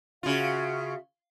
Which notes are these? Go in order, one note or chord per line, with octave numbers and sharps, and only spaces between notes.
C#3 F4 F#4 E5 F5